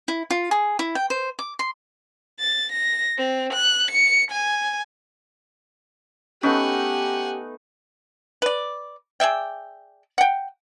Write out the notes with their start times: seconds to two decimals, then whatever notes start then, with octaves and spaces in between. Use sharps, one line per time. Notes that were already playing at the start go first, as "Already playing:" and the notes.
0.08 E4
0.30 F4
0.51 G#4
0.79 E4
0.95 G5
1.10 C5
1.39 D6
1.59 C6
2.40 A6
2.73 A#6
3.18 C4
3.53 F#6
3.91 C#7
4.31 G#5
6.43 A3 B3 C#4 D#4 G4 F#5 G#5
8.42 B4 D5
9.20 G#4 D5 E5 G5
10.18 F#5 G5